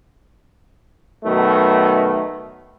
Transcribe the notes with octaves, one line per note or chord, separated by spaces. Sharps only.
B2 D#3 F#3 A3